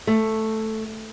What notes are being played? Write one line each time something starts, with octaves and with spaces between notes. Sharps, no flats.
A3